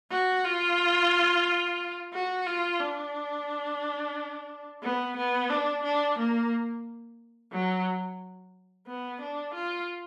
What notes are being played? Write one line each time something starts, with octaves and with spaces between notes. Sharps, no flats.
F#4
F4
F#4
F4
D4
B3
B3
D4
D4
A#3
F#3
B3
D4
F4